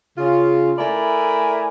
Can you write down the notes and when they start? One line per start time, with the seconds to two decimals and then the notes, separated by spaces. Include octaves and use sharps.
0.17 C#3 F4
0.78 A3 E4 A#4 D5 G#5 B5